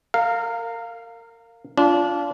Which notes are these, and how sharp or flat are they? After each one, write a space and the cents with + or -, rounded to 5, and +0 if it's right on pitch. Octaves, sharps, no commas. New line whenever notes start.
A#4 -25 F5 +0
D4 -25 F4 -10